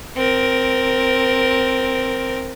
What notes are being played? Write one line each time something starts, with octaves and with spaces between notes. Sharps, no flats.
C4 A#4